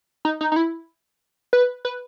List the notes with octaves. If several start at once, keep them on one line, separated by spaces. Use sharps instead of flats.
D#4
D#4
D#4
E4
B4
B4